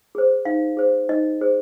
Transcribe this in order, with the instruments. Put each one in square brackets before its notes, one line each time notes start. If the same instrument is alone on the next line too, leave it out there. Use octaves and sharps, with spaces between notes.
[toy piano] G#4 C5
D#4 F5
G#4 C5
D#4 D#5
G#4 C5